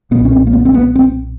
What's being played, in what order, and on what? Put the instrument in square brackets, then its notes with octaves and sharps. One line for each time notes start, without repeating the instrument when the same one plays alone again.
[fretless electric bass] A#2 B3
B1
C#4
C4
A#3
B3
C4
B3
C4